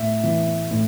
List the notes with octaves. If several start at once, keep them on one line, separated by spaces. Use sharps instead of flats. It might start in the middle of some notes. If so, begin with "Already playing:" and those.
Already playing: A2 E5
E3
A2